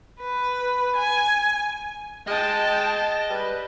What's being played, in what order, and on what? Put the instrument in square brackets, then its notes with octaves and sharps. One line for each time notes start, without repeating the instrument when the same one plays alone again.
[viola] B4
G#5
[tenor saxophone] G#3 [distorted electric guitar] D#5 [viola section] G5 A5
[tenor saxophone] G3 [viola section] B4